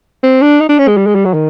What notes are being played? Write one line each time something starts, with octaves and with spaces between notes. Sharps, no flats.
C4
D4
D#4
D4
C#4
G#3
G3
G#3
G3
F#3
D#3